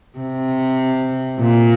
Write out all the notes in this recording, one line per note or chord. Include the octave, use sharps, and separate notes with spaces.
C3
A#2